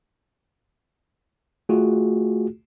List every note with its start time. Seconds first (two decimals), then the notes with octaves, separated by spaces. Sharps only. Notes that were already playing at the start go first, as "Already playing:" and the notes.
1.69 A3 F4 F#4 G#4